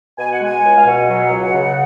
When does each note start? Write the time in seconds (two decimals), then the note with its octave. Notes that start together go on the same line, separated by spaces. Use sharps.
0.17 B2 G#5
0.30 F#5
0.40 G#3 G#5
0.63 C#2
0.76 F5
0.85 B2 F#5
1.08 F#3
1.29 C#2
1.53 C#3